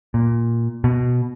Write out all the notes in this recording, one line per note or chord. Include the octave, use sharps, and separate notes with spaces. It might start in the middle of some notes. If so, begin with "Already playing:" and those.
A#2
B2